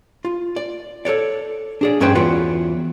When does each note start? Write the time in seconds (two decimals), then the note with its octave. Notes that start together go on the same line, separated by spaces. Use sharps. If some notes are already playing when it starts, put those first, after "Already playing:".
0.25 F4
0.56 D5
1.05 A4 B4 C#5 D5
1.81 D4 G#4 D5
2.00 G2 C#4 G#4 B4 C5 G5
2.15 E2 F4 F#4 B4 C#5